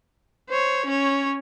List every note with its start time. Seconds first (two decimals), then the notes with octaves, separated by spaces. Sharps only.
0.49 C5 C#5
0.86 C#4 C#5